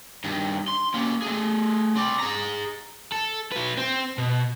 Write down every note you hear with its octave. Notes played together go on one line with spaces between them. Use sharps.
G2 D#3
C6
A#3 C#4
A3 G#4
C4 D5
G#4 A#5
A4
F#3 B4
C4
B2